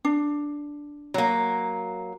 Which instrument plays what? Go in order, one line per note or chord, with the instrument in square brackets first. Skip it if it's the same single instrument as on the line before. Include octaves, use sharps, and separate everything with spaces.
[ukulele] D4
[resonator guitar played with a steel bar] F#3 A#3